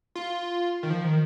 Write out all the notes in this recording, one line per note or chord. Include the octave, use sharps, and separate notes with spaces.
F4
D#3
F3
D#3